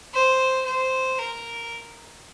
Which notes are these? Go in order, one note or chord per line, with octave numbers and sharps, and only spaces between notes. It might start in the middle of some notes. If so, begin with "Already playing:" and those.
C5
C5
A#4